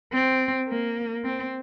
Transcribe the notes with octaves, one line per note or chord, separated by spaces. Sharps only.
C4
A#3
C4